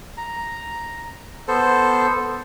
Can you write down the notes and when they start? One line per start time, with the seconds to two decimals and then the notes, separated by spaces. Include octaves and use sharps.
0.17 A#5
1.48 B3 A4 C5